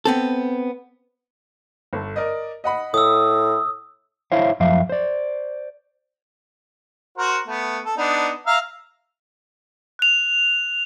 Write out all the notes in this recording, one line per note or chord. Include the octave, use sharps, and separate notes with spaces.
B3 C4 A4
G1 A4
A#4 D5 D#5
D#5 F#5 B5
A2 D#6 E6
E4 C5 C#5 E5 F5
F#2 F3 E5 F5
C5 D5
F#4 A#4 C5
A3 B3
A4
B3 D4 D#4
E5 F5 A#5
F#6 F7